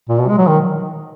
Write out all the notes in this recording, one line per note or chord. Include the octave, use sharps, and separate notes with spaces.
A#2
B2
G#3
F#3
D#3